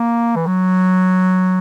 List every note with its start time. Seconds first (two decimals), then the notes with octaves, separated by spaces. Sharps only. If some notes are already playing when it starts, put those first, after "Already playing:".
Already playing: A#3
0.36 E3
0.47 F#3